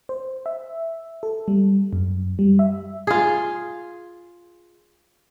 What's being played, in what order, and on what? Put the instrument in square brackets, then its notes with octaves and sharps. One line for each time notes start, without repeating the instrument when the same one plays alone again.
[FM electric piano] C5
E5
A4
G3
F#2
G3
E5
[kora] F4 G#4